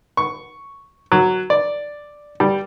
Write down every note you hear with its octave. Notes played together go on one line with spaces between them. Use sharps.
C#6
F#3
D5
G3